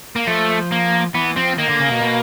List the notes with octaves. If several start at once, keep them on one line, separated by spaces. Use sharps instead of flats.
A#3
F3 A3
A#3
E3 B3
F3 C4
D#3 A#3
D3
C#3
B2
B2